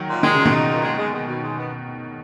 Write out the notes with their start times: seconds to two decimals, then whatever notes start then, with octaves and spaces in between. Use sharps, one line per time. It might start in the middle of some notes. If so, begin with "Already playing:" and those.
Already playing: D#3 F#3
0.08 A#2
0.23 D#3 G#3
0.34 A#2 C#3
0.45 B2 D#3
0.53 D#4
0.68 A#2
0.83 G#3
0.98 G#3
1.13 G#3
1.28 B2
1.43 G#3
1.58 B3